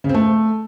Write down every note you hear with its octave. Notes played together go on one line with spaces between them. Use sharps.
C#3
C4
A3